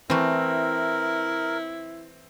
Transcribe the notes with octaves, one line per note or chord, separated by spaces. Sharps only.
E3 A3 C4 E4 A#4